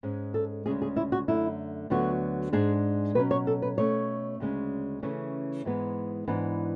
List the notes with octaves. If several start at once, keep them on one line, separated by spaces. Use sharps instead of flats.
G#2 G#3 C#4
A4
D2 C#3 G#3 C#4 G#4
G#4
E4
F#4
F#2 D3 A3 E4
D2 D3 F#3 B3 F#4
G#2 G#3 D4 G#4
B2 F#3 C#4 B4
C#5
A4
B4
B2 A3 C#4 C#5
D2 C#3 G#3 C#4
C#3 E3 A3 C#4
G#2 E3 G#3 B3
G#2 E3 B3 D4